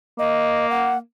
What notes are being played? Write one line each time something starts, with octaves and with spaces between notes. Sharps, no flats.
A#3 D#5
F#5